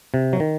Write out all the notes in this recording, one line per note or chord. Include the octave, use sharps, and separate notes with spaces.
C3
F#3
D#3